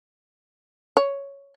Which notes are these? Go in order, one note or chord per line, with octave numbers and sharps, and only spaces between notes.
C#5